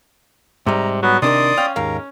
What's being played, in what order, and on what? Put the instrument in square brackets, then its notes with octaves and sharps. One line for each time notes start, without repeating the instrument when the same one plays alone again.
[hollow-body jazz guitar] G#2 G3 [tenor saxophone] C3 [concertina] A#5
[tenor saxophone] F#3 [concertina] B3 B4
[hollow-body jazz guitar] C3 D4 A#4 [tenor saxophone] D#3 [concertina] D5 C6 D#6
[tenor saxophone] C#4 [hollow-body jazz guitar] F5 G5
[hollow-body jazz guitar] D#2 G#2 F5 [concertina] A#4